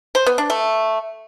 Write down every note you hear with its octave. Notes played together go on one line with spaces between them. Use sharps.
C5
B3
D4
A3